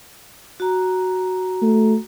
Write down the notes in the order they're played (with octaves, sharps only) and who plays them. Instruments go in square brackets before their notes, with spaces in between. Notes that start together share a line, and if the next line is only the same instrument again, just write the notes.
[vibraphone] F#4 A#5
[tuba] A3